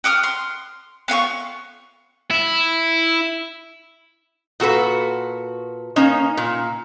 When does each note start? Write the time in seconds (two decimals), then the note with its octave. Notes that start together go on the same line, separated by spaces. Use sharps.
0.04 F#4 G5 D#6 F6
0.23 C6
1.08 B3 F4 G5 C#6
2.30 E4
4.60 A#2 F#4 A4 B4
5.96 A#3 C#4 D#4
6.37 A#2